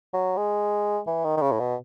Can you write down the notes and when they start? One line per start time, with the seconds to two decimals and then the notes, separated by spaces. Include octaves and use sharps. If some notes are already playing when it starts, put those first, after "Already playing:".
0.13 F#3
0.37 G#3
1.07 E3
1.24 D#3
1.37 D#3
1.42 C#3
1.51 A2
1.59 B2